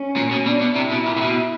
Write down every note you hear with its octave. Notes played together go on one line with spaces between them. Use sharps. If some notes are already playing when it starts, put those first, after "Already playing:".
Already playing: C#4
A#2
B2
B2 D4
B2
C3 E4
B2
A#2
C3
B2